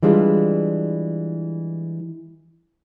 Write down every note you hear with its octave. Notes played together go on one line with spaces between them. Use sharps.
E3 G3 G#3 D4 F4